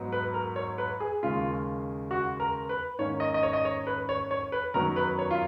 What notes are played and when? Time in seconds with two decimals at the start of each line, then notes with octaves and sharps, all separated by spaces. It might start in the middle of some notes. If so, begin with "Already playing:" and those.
Already playing: G#2 F#3 B3 D#4
0.12 B4
0.34 A#4
0.56 C#5
0.78 B4
1.00 G#4
1.23 D#2 C#3 G#3 F4
2.11 F#4
2.40 A#4
2.69 B4
2.99 G#2 D#3 A#3 C#4 C#5
3.20 D#5
3.34 D#5
3.43 C#5
3.53 D#5
3.65 C#5
3.87 B4
4.09 C#5
4.31 C#5
4.52 B4
4.74 F#2 D#3 F#3 B3 D#4 A#4
4.96 B4
5.19 C#5
5.31 F4